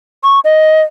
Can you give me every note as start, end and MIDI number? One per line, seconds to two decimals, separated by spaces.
0.23 0.40 85
0.44 0.82 75